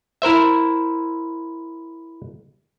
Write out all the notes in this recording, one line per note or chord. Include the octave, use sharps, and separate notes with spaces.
E4 A#4 C5 E5